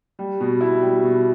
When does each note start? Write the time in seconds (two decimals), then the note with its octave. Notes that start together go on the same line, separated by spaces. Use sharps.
0.19 G3
0.40 B2
0.61 E4
0.82 G3
1.03 B2